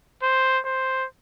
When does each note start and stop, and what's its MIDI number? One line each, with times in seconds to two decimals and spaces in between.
0.23 0.60 72
0.65 1.06 72